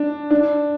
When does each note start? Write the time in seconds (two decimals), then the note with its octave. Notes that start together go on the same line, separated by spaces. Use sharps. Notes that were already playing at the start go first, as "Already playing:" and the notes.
Already playing: D4
0.31 D4